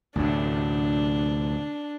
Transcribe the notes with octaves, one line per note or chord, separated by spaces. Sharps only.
D2 A2 C3 D4